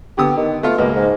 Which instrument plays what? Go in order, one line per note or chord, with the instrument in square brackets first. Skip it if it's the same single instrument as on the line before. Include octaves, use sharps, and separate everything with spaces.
[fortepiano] D3 B3 D#6 [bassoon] G4
[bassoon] D#3
[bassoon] A3 [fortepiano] B3 F4
[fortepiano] C#2 A#3 [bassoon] B2
[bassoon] G#2